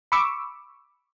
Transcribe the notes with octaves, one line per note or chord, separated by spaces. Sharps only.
B5 C#6 D6 E6